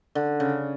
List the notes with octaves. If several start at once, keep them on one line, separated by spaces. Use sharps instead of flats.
D3
C#3